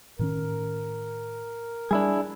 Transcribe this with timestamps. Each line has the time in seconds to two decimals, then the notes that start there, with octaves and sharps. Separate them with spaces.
0.19 A2 D#3 C#4 A#4
1.91 G3 D4 E4 G#4